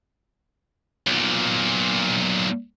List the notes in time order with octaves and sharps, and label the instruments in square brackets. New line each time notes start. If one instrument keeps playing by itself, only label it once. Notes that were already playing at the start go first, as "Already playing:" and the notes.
[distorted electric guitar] B1 A#2